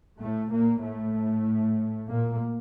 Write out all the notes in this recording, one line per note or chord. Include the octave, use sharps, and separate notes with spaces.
A2 A3
A#2 A#3
A2 A3
A#2 A#3